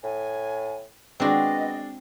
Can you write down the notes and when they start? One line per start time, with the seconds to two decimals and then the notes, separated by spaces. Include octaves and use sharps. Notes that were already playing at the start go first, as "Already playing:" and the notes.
0.04 A2 G#5
1.20 G#3 B3 C4 D4 F#4 D5 D#5